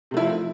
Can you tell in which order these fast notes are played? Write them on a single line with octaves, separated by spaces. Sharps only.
C3 A3 E4 F3